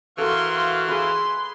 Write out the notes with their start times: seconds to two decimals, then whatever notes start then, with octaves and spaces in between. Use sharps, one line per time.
0.18 E3 F#4 A4 A#4 F5 C6 C#6
0.89 G#4 B4 C6